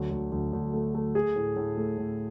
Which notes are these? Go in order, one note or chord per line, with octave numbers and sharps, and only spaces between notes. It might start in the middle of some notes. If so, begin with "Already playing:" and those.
Already playing: D2 F#3
D2
D2
D2
A3
A3
A3 G#4
A2
A2
A3
A2